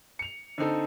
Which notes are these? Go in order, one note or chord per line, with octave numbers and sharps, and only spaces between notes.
C#7 F7
D3 C4 D#4 A4